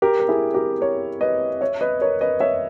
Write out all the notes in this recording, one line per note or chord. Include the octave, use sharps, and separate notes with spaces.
G4 A#4
A#4
E4 G#4
G4 A#4
A#4 C#5
B4 D#5
C#5 E5
B4 D#5
A#4 C#5
B4 D#5
C#5 E5